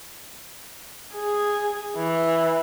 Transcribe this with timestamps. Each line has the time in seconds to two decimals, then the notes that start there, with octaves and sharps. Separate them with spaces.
1.14 G#4
1.96 E3